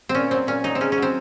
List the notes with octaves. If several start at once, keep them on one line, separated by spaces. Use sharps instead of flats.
C4
A#2 C#4
F#3 C4
A#2 C#4
F#3 D#4
C4
C#3 C#4
C#4
F#3 C4